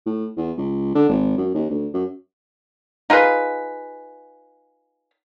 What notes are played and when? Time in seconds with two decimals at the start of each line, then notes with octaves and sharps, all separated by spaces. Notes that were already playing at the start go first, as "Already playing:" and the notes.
0.06 A2
0.37 E2
0.58 C#2
0.95 D3
1.09 G#1
1.37 F#2
1.54 D#2
1.70 D2
1.94 F#2
3.10 D#4 F4 G#4 B4